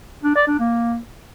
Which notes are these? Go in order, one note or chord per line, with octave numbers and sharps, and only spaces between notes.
D4
D5
D4
A#3